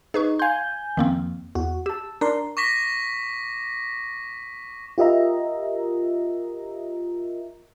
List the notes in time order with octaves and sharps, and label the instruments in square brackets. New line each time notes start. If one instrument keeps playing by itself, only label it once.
[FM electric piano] D#4 [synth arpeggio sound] G#4 B4 C#6
[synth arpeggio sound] F5 C6 [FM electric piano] G#5 G6
[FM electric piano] F2 [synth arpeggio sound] D#3 A#3 C4
[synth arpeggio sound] E2 [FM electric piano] F#4
[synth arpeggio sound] G4 [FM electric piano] A5 E6
[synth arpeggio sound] D4 [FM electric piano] A#4 D5 C6
[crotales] C#6 D6 A#6 B6
[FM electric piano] F4 G4 A#4 D#5 E5 A#5